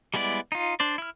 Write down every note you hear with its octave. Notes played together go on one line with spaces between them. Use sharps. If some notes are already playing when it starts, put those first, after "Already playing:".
G3 G#3 B3 E4 D5
D#4 F4
D4 C5 D5
E4 F6